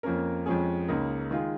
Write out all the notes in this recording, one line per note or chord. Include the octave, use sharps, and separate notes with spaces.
F2 F3 A#3 C#4 A#4
F2 F3 G#3 C#4 G#4
C#2 C#3 A#3 D#4
D#3 G#3 F4 G#4